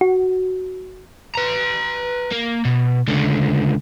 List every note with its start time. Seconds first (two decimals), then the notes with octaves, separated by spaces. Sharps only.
0.01 F#4
1.35 B4 A#5
2.32 A#3
2.65 B2
3.08 C#2 D3